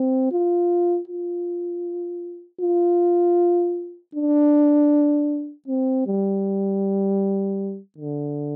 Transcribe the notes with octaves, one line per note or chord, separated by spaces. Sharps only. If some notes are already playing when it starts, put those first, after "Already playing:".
Already playing: C4
F4
F4
F4
D4
C4
G3
D3